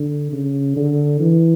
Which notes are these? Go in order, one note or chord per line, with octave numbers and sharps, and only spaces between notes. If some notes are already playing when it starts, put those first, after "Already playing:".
Already playing: D3
C#3
D3
E3